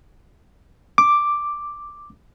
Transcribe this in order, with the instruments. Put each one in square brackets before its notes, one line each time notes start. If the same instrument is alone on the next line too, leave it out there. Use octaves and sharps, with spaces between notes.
[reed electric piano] D6